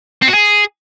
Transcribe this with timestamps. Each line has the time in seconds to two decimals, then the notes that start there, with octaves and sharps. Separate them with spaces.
0.22 C4
0.28 F#4
0.34 G#4